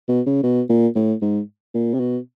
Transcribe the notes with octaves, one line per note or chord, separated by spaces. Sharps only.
B2
C#3
B2
A#2
A2
G#2
A#2
C3
B2